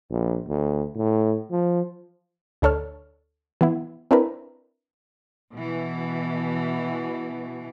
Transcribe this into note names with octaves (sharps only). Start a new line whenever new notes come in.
A#1
D2
A2
F3
D2 D4 A4 C#5 F6
E3 B3 E4
C4 D4 E4 A#4 B4
B2 E3